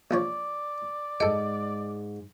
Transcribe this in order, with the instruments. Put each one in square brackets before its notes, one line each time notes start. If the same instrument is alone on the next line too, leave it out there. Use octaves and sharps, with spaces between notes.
[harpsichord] A#1 F3 C#5 [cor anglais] D5
[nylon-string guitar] G#2 G#3 [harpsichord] A4 G5 [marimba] D#5